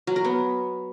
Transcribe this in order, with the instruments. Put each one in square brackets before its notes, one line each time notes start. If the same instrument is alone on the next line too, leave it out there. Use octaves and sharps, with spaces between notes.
[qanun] F#3
A#4
B3